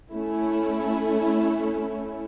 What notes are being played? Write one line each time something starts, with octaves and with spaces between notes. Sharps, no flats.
A3 C#4 E4